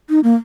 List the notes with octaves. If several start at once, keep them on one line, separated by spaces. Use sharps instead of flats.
D#4
A#3